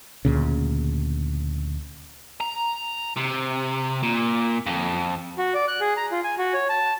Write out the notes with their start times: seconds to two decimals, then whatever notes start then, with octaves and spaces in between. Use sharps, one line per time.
0.25 D2 A#2 C#3
2.41 A#5
3.17 C3
4.03 A#2
4.67 F2
5.38 F#4
5.54 D5
5.68 F#6
5.81 G#4
5.97 A#5
6.11 F4
6.24 G#5
6.38 F#4
6.54 C#5
6.69 A5